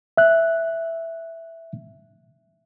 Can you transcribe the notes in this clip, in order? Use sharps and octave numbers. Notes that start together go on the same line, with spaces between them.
E5 F#6